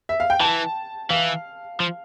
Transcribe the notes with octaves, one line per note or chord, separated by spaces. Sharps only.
E5
F5
G5
E3 A5
E3 F5
F3